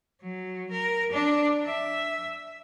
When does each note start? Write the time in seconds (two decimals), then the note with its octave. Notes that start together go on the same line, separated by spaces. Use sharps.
0.22 F#3
0.71 A#4
1.12 D4
1.65 E5